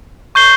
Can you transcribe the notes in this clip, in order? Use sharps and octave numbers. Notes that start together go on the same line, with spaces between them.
C#6 G6 C7 G7